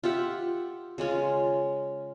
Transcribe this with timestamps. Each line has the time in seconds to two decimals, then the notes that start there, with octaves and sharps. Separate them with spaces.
0.03 F4 G4 E5 F#5
0.98 C#3 G#3 C#4 F4